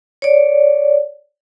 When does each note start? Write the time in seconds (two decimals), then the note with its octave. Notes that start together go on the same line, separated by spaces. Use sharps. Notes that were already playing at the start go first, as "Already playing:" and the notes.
0.22 C#5 D5